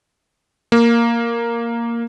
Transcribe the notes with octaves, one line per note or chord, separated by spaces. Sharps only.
A#3